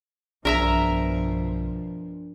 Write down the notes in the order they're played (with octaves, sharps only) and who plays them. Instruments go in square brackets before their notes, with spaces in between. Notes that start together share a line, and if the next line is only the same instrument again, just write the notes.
[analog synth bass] B1 [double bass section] G2 B2 F3 [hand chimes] D4 [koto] A#4 E5 A#5